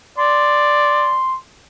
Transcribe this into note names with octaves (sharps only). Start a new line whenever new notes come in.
D5 C6